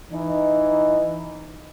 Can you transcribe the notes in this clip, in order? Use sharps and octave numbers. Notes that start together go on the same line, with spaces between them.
E3 D#4